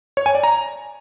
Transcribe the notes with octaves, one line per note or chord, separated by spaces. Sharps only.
C#5
G#5
D5
A#5